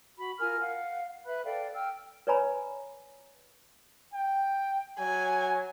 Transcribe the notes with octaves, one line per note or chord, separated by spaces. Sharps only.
F#4 B5
F4 A#4 G#5 F6
F5 F#5
B4 E5 B5 F#6
A4 D5 F5 G5
G5 E6 F6
B4 C#5 D5 G#5 A#5 B5
G5
F#3 G#5